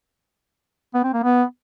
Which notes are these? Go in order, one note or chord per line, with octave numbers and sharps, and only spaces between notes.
B3
C4
A#3
B3